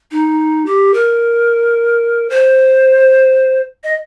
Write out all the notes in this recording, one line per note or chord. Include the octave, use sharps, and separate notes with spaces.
D#4
G4
A#4
C5
D#5